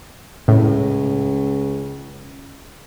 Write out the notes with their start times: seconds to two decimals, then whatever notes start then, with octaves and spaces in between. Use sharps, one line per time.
0.48 C#2 A2